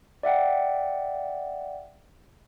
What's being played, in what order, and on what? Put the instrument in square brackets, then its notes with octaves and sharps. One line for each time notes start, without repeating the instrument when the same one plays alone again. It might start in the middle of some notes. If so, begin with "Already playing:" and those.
[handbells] D5 E5 F#5 G5